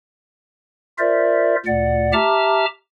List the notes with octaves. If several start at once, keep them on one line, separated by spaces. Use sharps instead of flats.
F4 A#4 C5 D5 E5
D2 A#2 D5 F#5
G4 E5 A5 A#5 D6 F6